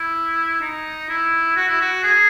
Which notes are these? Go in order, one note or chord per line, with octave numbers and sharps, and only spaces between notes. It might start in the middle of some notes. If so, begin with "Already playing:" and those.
Already playing: E4
D#4
E4
F#4
E4
F#4
G#4